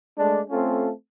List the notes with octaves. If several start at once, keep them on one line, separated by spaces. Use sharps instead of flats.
G#3 A3 D4
A3 C4 C#4 F4 A4